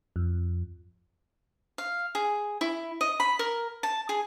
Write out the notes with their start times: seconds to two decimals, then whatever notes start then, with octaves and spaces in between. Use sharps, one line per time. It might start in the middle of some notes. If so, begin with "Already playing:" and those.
0.16 F2
1.78 F5
2.15 G#4
2.61 E4
3.01 D#5
3.20 B5
3.39 A#4
3.83 A5
4.09 G#4